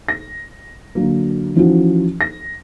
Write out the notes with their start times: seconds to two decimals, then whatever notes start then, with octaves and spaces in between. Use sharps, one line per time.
0.08 A#6
0.95 D3 F#3 A#3
1.56 E3 F3 C#4 D#4 E4 F#4
2.21 A#6